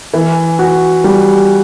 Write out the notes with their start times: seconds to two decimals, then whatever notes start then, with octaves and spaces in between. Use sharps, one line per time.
0.13 E3
0.59 F#4
1.04 G3